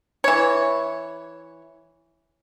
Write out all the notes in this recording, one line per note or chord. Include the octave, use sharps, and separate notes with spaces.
E3 C#5